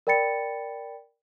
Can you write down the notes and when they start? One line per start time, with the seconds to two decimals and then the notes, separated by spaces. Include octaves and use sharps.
0.07 A#4 D5 G5 B5 A6 C#7